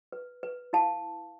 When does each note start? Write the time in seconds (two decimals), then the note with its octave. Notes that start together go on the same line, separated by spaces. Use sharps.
0.12 B4
0.43 B4
0.73 E4 F5 A5